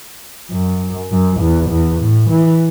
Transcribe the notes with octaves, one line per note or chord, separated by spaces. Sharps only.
F#2
F#2
E2
E2
A2
E3